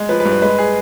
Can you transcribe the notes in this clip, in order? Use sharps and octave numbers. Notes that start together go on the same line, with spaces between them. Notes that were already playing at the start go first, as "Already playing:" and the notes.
Already playing: G#3
F3 B4
B4
G2
B4
G#3 B4
G#4